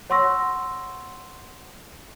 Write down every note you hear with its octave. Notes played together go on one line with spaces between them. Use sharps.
C#5 F#5 C6 C#6 E6 A#6